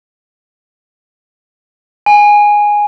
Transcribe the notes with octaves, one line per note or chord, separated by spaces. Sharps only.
G#5